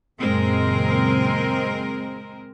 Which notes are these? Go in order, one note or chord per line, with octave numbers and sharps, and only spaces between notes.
F#1 A#2 G#3 C4 A#4